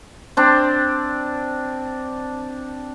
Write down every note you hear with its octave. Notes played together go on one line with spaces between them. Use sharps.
C4 D4